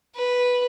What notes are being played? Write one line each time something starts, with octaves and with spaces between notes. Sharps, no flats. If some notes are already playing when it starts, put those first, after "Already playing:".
B4